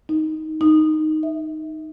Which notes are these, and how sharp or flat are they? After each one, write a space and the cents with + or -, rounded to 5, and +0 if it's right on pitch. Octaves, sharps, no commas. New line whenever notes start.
D#4 +10
D#4 +0
E5 -15